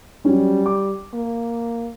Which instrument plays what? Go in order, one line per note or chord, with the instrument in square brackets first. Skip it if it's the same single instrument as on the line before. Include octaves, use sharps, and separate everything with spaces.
[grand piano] F#3 C#4 [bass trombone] G3
[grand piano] D6
[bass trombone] A#3